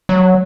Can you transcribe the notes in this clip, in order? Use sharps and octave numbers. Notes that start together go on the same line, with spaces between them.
F#3